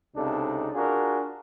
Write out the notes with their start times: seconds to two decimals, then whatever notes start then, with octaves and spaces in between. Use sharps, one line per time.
0.16 C#2 C3 D4 D#4 A4
0.74 D4 F4 F#4 G#4 A#4